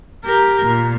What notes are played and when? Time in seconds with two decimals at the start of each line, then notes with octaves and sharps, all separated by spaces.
0.25 G4 A#4
0.66 A#2